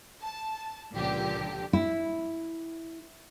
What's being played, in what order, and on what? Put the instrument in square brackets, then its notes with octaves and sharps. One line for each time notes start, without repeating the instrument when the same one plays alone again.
[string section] A5
C#2 A#2 D3 F3 G4
[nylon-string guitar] E4